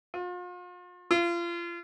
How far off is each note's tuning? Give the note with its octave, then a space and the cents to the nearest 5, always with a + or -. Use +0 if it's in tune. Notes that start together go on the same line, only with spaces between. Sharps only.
F4 +40
F4 -30